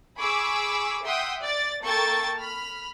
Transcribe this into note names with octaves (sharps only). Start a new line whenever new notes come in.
G#4 B5 C#6 D6 E6
E5 F#5 G5 C6 D#6
D5 A6
A#3 A4 G5 A5 C#6 A6
B5 F6